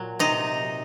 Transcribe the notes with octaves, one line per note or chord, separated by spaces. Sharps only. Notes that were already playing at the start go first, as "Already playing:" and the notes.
Already playing: A#2 F#3
C3 D#4